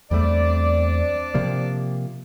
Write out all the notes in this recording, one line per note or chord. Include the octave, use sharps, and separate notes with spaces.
E2 G3 A3 C4 D4 D5
C3 F3 A#3